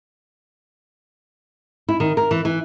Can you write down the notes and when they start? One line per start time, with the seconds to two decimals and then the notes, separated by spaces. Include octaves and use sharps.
1.88 E4
2.00 D#3
2.17 A#4
2.31 E3
2.45 E3